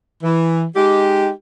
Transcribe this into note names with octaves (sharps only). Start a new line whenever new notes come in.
E3
G#3 D#4 G4